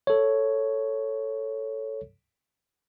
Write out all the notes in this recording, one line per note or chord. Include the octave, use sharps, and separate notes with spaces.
A4 C#5